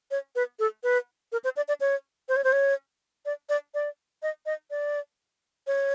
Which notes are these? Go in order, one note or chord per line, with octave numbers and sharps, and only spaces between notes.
C#5
B4
A4
B4
A#4
C5
D5
D5
C#5
C5
C#5
C5
C#5
D5
D5
D5
D#5
D#5
D5
C#5